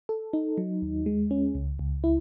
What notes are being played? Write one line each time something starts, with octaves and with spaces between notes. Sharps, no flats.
A4
D#4
F#3
D#2
G#3
C#4
C#2
C#2
E4